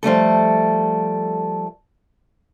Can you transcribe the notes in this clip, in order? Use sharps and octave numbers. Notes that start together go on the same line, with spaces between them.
F3 G3 A3 A4